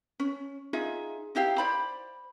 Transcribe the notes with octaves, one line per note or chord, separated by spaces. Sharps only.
C#4
D#4 F4 G#4 E5
D#4 E4 G4 F5
C5 D5 B5